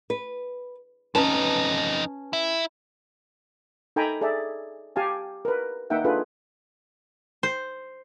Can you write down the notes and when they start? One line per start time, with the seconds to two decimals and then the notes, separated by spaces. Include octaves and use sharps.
0.10 B4
1.15 F2 C#4 D#4 B4 A5
2.33 E4
3.96 D#4 A4 G5 G#5 A#5 B5
4.21 G#4 A4 D5 E5
4.96 G4 F5 G#5 A5
5.45 A#4 B4
5.90 A#3 D#4 E5 F#5 G5
6.04 D4 F4 G#4 A4 B4
7.43 C5